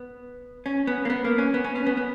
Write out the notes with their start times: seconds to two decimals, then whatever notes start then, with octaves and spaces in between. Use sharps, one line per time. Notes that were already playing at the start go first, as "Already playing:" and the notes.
Already playing: B3
0.66 C#4
0.87 B3
1.05 A#3
1.10 B3
1.25 A#3
1.38 C#4
1.54 B3
1.64 C#4
1.75 C#4
1.86 B3
1.97 B3